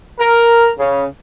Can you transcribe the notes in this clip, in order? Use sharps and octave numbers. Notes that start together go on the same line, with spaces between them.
A#4
C#3